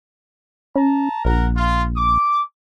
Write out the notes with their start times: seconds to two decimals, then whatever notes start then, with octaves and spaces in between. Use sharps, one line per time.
0.76 C#4 A5 A#5
1.25 A#1 A#4 F#5 A#5
1.57 F4
1.97 D6